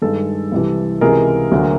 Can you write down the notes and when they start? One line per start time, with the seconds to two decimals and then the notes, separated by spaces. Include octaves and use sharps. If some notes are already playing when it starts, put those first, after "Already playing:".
0.02 G2 D#3 G#3 A4
0.52 C2 C3 E3
1.01 C#2 C3 E3 G#3 G#4 A#4
1.52 D2 D3 F#3 A#3